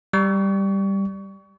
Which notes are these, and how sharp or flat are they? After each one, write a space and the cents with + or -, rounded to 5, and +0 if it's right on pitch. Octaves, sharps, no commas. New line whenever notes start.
G3 +0 C#6 +30